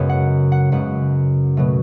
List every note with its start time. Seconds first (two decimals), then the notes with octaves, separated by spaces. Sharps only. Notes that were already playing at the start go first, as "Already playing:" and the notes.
Already playing: F#2 C#3 G#3 B3 C#5
0.09 F#5
0.52 F#5
0.72 F#2 C#3 G#3 B3 F#5
1.57 B2 F#3 A3